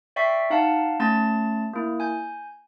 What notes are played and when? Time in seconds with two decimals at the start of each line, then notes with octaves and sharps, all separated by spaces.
0.16 D5 E5 G5 C#6 B6 C7
0.50 D#4 F5 F#5 A5
1.00 A3 C#4 A5 C6 A6
1.73 A#3 E4
2.00 G#5 G6